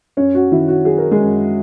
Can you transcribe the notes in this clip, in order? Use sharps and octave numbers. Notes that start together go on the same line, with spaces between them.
F#2 C#4 C#5
F#4
D#3 E4
F#4
F#3 G#4
A#4
G#3 G#4
F#2